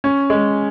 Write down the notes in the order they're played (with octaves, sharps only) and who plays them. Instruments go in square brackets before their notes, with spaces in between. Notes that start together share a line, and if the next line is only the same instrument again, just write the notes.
[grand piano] C#4
G#3